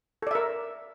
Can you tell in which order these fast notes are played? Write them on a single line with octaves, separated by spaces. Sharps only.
A4 D5 E5 A#4